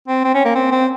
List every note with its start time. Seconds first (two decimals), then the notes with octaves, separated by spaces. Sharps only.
0.08 C4
0.24 C4
0.35 C#4
0.45 A#3
0.55 C4
0.71 C4